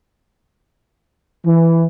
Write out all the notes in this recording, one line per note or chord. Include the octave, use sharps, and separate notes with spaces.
E3